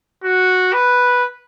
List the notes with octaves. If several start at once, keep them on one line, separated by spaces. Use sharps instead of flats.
F#4
B4